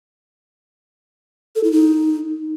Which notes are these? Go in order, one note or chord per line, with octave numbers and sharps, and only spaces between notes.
A4
E4
D#4